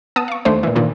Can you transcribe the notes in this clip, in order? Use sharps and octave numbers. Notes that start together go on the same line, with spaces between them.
B3 A5 D#6
F5 C#6
D#2 A3 D4 C5
A#2 E3
G2 A#2 D#3